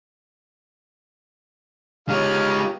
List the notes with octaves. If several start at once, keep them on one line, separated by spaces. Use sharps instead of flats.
G#3 B3 D#4 F4 G4 C#5 F5